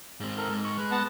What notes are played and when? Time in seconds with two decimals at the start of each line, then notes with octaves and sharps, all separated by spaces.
0.20 G#2 C4
0.37 A4 A#4
0.49 G#2
0.64 C#6
0.78 G#3 B4
0.91 B3 F#5 A5